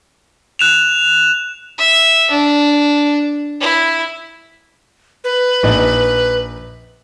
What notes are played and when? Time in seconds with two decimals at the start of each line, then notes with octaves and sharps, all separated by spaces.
0.59 F#6 E7 F7
1.78 E5
2.31 D4
3.61 E4
5.24 B4
5.63 A#1 D#4